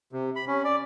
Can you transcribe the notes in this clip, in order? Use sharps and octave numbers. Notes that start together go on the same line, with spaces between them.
C3
B5
C#4
D5